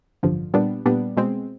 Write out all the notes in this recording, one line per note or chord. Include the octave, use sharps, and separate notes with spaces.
A1 G2 D3 F3
A#2 G3 B3 D4
A#2 G3 B3 D4
B2 G#3 C4